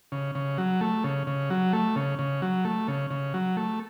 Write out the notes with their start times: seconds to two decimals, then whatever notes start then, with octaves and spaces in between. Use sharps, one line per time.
0.12 C#3
0.35 C#3
0.58 F#3
0.81 A3
1.04 C#3
1.27 C#3
1.50 F#3
1.73 A3
1.96 C#3
2.19 C#3
2.42 F#3
2.65 A3
2.88 C#3
3.10 C#3
3.34 F#3
3.57 A3